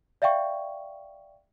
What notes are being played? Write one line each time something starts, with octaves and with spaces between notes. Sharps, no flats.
D5 E5 F5 G5 C#6